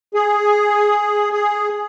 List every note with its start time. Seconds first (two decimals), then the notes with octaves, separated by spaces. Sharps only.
0.14 G#4
1.32 G#4